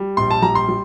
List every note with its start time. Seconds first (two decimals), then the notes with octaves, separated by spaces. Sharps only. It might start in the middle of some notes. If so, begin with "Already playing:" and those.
Already playing: G3
0.17 A#1 C6
0.31 A5
0.42 G3 A#5
0.55 C6
0.69 G3